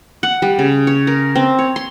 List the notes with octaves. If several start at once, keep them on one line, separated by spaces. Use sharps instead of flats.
F#5
G3
C#3
C#5
A#4
C4
C#5
C6